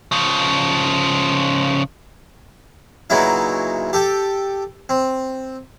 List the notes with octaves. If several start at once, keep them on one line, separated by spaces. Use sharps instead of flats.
C#3 F3
A#2 C#3 F#3 B3 D#4 E4
G4 A4 G5
C4